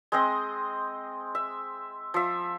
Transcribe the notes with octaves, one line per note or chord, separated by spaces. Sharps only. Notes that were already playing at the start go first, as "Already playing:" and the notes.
G#3 C4 D#5
E5
F3 E5